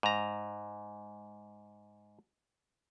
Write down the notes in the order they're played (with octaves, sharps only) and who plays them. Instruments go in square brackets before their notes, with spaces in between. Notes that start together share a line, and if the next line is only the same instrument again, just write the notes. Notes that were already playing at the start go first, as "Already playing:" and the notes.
[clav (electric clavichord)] G#2 A#5